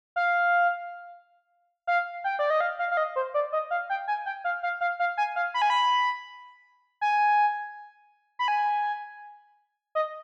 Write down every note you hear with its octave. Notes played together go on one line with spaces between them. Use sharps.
F5
F5
G5
D5
D#5
F5
F5
F5
D#5
C5
D5
D#5
F5
G5
G#5
G5
F5
F5
F5
F5
G#5
F5
B5
G#5
B5
G#5
B5
G#5
D#5